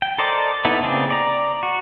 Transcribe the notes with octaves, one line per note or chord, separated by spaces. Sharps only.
G5
A4 A#4 C5 D5 D#5
B3 D#4 E4 A4
C#3 A#3 C4 G#4 D5
D5 A#5
F#4